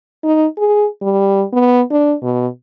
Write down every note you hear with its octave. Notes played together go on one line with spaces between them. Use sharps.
D#4
G#4
G3
B3
D4
B2